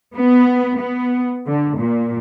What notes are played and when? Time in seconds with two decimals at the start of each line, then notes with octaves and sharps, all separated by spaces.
0.16 B3
0.78 B3
1.47 D3
1.79 A#2